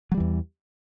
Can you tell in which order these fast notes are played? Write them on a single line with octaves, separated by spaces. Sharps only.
F#3 G3 E3 E2